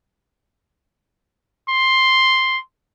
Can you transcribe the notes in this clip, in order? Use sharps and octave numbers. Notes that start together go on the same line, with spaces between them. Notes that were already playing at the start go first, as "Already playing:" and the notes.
C6